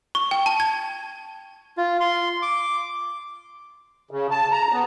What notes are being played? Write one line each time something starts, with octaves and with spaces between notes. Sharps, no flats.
C#6
G5
A5
G#6
F4
C6
D6
C#3
A5
A#5
B3